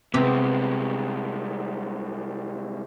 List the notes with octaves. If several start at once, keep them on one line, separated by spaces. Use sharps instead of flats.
C2 C3 G#3 B3 G4